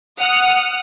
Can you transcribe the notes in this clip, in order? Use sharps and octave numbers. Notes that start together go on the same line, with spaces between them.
F#5 D#6 F6